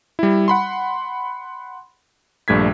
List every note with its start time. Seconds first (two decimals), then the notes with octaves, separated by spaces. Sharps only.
0.19 G3 E4
0.48 F#5 B5 C6
2.48 A#1 G2 A3 G#6 B6